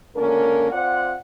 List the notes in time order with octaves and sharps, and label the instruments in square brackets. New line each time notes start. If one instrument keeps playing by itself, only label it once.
[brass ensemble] C#2 D3 A#3 C#4 A#4
C4 F4 C5 D5 F#5